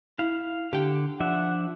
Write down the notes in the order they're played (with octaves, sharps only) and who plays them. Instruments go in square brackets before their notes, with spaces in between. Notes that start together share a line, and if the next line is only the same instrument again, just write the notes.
[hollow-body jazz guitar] E4 [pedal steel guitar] F5
[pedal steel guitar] D3 [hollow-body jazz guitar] G4 G5
[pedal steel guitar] F3 D4 E5 [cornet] F#5